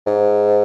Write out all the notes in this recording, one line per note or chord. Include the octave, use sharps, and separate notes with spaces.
G#2